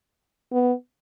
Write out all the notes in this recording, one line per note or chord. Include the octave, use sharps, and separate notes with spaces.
B3